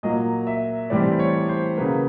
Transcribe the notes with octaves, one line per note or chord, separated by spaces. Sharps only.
A#2 F#3 A#3 D#5
E5
A2 E3 G3 C4 D5
C#5
C5
C#3 F#3 A#3 B4